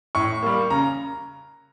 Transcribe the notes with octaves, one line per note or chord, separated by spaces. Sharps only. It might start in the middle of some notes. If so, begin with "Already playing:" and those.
A2 C#6
G3 A#3
C#3 A#5